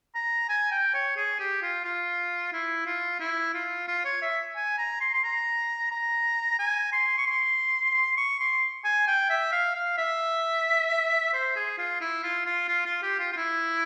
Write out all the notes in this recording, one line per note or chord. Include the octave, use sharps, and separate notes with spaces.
A#5
G#5
G5
C#5
G#4
G4
F4
F4
E4
F4
E4
F4
F4
C#5
E5
G#5
A#5
C6
C6
A#5
A#5
G#5
C6
C#6
C6
C6
C#6
C6
G#5
G5
E5
F5
F5
E5
C5
G#4
F4
E4
F4
F4
F4
F4
G4
F4
F4
E4